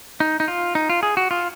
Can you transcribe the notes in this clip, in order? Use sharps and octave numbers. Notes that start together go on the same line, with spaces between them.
D#4
D#4
F4
D#4
F4
G#4
F#4
F4